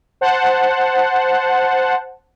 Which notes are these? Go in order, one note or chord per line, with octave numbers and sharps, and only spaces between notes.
C5 F#5 A5